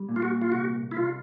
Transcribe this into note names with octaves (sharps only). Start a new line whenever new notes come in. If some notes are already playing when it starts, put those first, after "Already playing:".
Already playing: G3
A#2
F4
F#4
F4
C2 F#4
E4
C2 F4